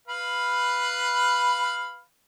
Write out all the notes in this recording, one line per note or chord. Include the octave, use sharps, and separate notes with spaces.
B4 F5 B5